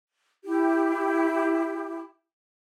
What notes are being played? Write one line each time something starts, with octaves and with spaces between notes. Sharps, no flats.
E4 G4